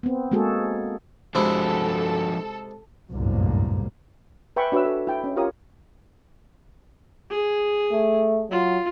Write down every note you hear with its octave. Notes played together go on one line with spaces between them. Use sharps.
B3 C4
G#3 A#3 F#4 G#4 A4
C3 F3 G#3 D4 E4 F#4 A4
G1 C2 F#2 A2 A#3
B4 E5 G5 G#5 B5 C#6
D4 F#4 B4 C#5 E5 E6
A4
E4 G5
C#4
F4 G4 A#4 C#5 D#6
G#4
A3
F#3 F4